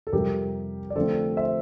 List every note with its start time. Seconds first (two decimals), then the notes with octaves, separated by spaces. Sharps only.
0.07 A4
0.13 F2 C3 G3 G4 A#4
0.90 D5
0.95 D3 F3 A3 C4 A4 C5
1.37 C5 E5